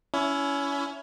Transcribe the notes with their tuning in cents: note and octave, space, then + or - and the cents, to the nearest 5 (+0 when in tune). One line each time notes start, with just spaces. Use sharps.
C#4 +25 E4 +10